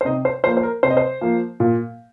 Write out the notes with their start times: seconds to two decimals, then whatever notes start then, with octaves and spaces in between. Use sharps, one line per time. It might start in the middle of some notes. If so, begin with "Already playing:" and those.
0.01 C5
0.05 C3 D#4 D#5
0.25 C5
0.44 F3 A#3 C5
0.57 C5
0.63 A#4
0.83 C3 C5
0.90 D#5
0.97 C5
1.21 F3 A#3
1.60 A#2